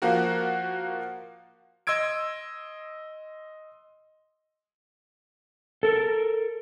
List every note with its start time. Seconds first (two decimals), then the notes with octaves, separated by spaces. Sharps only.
0.02 F3 A#3 F4 F#4 A#4
1.87 D#5 C6 E6 G#6 D7
5.83 A4 A#4